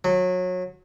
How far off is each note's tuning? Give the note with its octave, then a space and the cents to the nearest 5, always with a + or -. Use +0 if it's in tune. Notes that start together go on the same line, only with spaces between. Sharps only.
F#3 -25